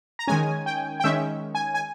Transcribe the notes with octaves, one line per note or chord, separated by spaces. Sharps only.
A#5
D#3 G#3 C#4 G#5
G5
G5
D#3 G#3 C#4 E5
G#5
G#5